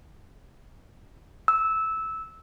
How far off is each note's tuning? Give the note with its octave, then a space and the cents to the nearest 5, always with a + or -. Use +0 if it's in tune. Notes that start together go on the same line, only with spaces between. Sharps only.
E6 -15